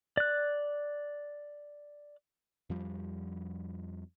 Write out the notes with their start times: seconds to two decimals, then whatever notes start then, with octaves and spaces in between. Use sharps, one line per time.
0.17 D5 F#6
2.70 F2 F3 G3